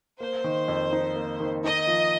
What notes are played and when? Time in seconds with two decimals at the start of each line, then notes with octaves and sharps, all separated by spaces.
0.20 A#3 C5
0.44 D#3
0.68 F2
0.92 D#4
1.16 A#3
1.40 D#3
1.64 D#4 D#5
1.87 F3